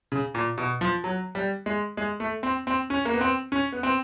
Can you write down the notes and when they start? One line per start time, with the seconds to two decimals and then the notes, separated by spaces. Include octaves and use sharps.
0.12 C#3
0.35 A#2
0.58 B2
0.81 F3
1.04 F#3
1.35 G3
1.66 G#3
1.97 G#3
2.20 A3
2.43 C4
2.67 C4
2.90 C#4
3.05 A#3
3.14 B3
3.21 C4
3.52 C#4
3.72 B3
3.83 C4